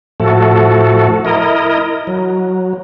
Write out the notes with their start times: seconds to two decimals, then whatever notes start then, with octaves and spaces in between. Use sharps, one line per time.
0.20 A2 F3 A3 F#4 A4
1.25 E4 A#4 D#5
2.07 F#3